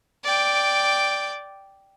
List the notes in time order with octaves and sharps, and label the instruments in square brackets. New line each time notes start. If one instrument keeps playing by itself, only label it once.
[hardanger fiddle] D5 G5